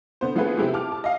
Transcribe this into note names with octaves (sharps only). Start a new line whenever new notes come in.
D3 B3 C5
F3 A3 B3 F4 G#4 B4
C3 G#3 C4 E4 G4
A5 D6 F6
A5
D#5 F5